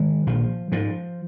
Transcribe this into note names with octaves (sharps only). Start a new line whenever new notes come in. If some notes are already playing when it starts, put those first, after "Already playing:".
Already playing: D#3 G#3
A#1 F3
G#2 F3